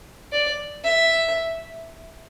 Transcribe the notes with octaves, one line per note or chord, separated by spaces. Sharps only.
D5
E5